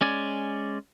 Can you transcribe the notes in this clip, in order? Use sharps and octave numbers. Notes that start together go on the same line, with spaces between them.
G#3 C#4 D5 G#5